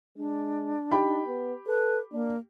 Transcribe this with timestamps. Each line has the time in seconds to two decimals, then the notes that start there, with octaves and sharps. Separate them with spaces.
0.17 G#3 D4
0.91 D#4 G4 G5 B5
1.27 B3
1.67 A4 B4
2.12 A#3 D4